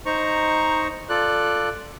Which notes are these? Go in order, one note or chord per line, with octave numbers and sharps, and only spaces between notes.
D#4 C5 A#5 C#6
F4 A4 D5 F#6